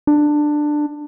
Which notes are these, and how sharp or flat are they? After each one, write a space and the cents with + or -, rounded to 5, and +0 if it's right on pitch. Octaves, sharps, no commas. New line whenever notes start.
D4 +15